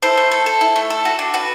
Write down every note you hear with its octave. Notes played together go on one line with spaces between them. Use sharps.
E4 A4 C5
A3
A4
A4
E4
A3
A4
F#4
D4
F#4 B4